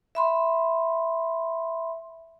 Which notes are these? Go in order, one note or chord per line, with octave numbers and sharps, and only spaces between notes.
E5 B5 C6